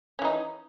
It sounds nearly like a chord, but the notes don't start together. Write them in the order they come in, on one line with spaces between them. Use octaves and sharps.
C#4 E3 D#4